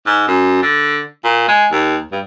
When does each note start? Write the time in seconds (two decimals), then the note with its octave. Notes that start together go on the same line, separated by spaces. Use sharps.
0.06 G#2
0.28 F#2
0.63 D3
1.24 A#2
1.48 G#3
1.72 D#2
2.12 G2